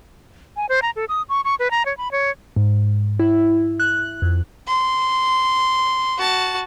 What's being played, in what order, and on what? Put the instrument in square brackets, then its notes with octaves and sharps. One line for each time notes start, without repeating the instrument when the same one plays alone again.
[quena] G#5
C5
A#5
A4
D#6
C#6
C#6
B4
A#5
C#5
B5
C#5
[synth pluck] G#2
E4
F#6
F2
[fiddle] C6
F#4 A5